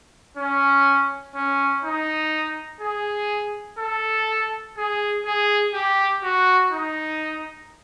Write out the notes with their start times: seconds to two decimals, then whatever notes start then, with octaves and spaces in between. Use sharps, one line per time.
0.37 C#4
1.35 C#4
1.85 D#4
2.81 G#4
3.79 A4
4.77 G#4
5.26 G#4
5.74 G4
6.23 F#4
6.72 D#4